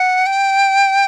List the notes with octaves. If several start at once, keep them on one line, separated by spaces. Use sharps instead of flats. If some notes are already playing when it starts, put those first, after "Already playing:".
Already playing: F#5
G5